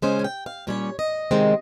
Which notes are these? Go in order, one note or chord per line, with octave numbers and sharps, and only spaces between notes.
C#3 G#3 C#4 C5
G#5
G5
F5
A#2 G3 C#4 C#5
D#5
C3 D#3 G#3 C4